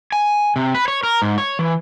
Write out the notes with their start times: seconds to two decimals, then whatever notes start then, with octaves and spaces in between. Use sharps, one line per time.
0.12 G#5
0.56 C3
0.75 B4
0.88 C#5
1.03 A#4
1.22 G#2
1.38 C#5
1.59 E3